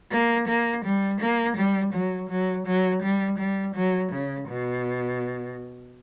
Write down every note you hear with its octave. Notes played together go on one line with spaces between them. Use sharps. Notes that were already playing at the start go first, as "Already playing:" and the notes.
A#3
A#3
G3
A#3
G3
F#3
F#3
F#3
G3
G3
F#3
C#3
B2